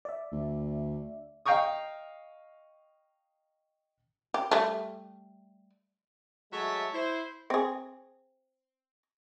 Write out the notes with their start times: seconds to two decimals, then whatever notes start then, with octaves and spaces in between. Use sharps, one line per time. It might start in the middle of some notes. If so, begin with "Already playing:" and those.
0.05 D5 E5
0.32 D2
1.46 D#5 F5 G5 A#5 C#6 D#6
4.34 G4
4.51 G3 A3
6.52 F#3 G#3 A3 C#5 E5 A5
6.94 E4 C5
7.50 C4 G#4